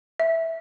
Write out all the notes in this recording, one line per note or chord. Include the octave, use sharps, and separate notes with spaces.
E5